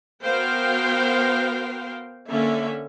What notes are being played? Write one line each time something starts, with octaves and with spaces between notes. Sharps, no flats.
B3 F#4 A#4 C5 F5 G5
D3 A#3 C#4 E5